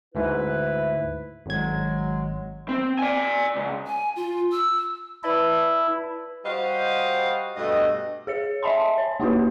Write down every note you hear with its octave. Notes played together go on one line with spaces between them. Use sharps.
D2 G#2 E4 B4
G#1 F#3 G#3 G#6
C4
D5 G#5
C#2
G#5
F4
E6
E4 B4 D5 A5
G3 F#4 C5 D#5 F5
G2 B2 A3 D#5
G#4 C#5 C#7
D#5 E5 G#5 A5 B5 C6
C#5
A#3 D#4 E4 F#4 G4 B4